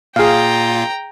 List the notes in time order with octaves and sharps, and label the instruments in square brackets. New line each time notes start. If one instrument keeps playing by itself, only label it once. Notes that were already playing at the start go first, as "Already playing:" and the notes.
[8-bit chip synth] A#2 F4 [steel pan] G#4 F5 [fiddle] G5 A#5